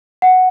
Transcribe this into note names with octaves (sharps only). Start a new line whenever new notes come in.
F#5